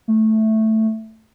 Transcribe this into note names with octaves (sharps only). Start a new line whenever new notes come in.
A3